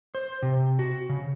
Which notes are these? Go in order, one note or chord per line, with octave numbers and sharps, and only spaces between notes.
C5
C3
F#4
C#3